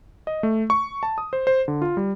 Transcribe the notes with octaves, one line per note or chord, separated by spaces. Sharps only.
D#5
A3
C#6
A5
D#6
C5
C5
D3
F4
G3